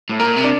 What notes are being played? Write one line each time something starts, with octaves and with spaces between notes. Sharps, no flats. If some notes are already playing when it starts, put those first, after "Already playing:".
A2
A#2 A#4
C3
D4